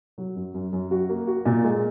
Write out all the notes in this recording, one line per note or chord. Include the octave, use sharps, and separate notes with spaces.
F#3
F#2
F#2
F#2
F#4
A#3
F#4
A#2
G#3